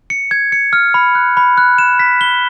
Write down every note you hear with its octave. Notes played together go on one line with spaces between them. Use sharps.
C#7
G#6
C#7
F6
B5
F#6
B5
F#6
E7
B6
G7